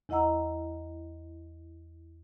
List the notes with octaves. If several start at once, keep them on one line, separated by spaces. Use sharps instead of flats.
E2 E4 D#5 F#5 A#5 E6